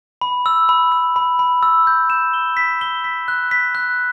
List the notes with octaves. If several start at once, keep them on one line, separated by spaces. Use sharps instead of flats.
B5
E6
B5
E6
B5
B5
E6
G6
E7
G7
B6
G7
B6
F#6
B6
F#6